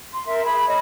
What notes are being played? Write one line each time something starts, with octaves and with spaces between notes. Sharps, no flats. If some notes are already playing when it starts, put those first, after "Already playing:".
C6
A#4 E5
G#4 B5
C#5 D#5